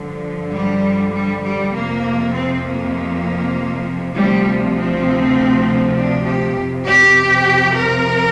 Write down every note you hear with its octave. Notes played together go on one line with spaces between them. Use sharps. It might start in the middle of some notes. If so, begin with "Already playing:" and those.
Already playing: G2 D3 F3
G3
G3
G3
F2 C3 F3 A#3
C4
A#3
D2 C3 F3 G3
C4
D4
G4
F2 C3 F3
G4
A#4